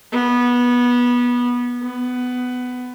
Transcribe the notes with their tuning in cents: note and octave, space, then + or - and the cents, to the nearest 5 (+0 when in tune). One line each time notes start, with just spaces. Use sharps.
B3 -20
B3 +15